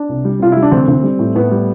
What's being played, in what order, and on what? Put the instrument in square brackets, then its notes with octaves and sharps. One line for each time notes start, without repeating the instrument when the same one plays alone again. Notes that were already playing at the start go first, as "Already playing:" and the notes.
Already playing: [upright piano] D4
C2
G3
C3 F4
G3 E4
D4
D2 C4
D2
G3
A2
A2 B3
G3